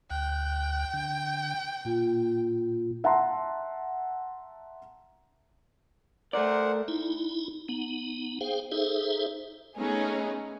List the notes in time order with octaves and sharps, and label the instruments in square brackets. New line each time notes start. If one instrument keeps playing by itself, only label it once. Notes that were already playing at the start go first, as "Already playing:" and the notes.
[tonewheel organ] D2 F#6 [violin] G5
[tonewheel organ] D3 G6
[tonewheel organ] A#2 [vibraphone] A#3 F4
[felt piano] E5 F#5 A5 A#5 C6
[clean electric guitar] A3 D5 [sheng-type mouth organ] A#4 C5 F#5
[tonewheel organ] D#4 E4
B3 D#4
G#4 C5 F5 G5
D#4 G#4 A4 C5 E5
[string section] A3 B3 C#4 D#4 G#4